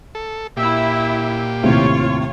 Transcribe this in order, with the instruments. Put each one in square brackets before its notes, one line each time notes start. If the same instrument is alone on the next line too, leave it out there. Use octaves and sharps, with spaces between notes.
[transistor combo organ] A4
[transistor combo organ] A#2 G4 [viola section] E4 E5
[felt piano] D#2 A2 C3 [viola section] F4 C#5